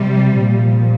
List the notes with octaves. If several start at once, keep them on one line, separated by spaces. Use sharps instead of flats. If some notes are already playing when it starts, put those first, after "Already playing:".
Already playing: C3 F3 G3
A#2 F3